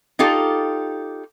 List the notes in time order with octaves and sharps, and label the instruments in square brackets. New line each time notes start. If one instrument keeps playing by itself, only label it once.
[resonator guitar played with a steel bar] D#4 F4 G4 A4